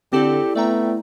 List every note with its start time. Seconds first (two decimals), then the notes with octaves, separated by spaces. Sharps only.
0.13 D3 C4 E4 G4 A4 D5
0.56 A3 B3 D5 G5 A#5